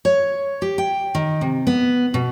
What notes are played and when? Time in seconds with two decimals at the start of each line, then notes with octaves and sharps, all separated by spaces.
0.05 C#5
0.62 G4
0.78 G5
1.15 D#3
1.41 C3
1.67 B3
2.14 B2